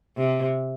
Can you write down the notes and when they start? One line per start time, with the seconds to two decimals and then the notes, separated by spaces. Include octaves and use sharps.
0.17 C3